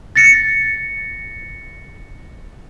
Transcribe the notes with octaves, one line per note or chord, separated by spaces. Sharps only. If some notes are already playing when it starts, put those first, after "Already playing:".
A6 A#6 C#7